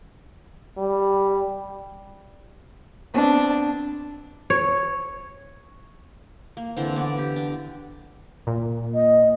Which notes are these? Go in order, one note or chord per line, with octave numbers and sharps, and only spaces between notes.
G3
B3 C4 D4
C#5
A#3
D3 E3 C4 C5
B3 D5
G4
D4
A#2
D#5